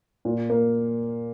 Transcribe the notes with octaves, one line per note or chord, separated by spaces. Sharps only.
A#2
A#3